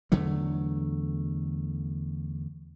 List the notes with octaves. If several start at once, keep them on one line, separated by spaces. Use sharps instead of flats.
E2 D3 F#3 A3